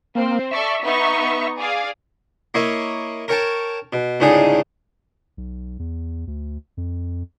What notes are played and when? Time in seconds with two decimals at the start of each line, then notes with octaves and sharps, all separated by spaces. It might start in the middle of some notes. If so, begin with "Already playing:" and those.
0.15 A#3 C4
0.51 A4 D5 E5 C#6
0.84 B3 D#4 C#6
1.58 G#4 D5 F5
2.54 A#3 E4 C#5 D#5
3.28 A#4 C#5 G5 A5
3.93 B2
4.20 C#2 A2 D3 D#4 G#4 G5
5.37 B1
5.79 E2
6.27 D2
6.77 F2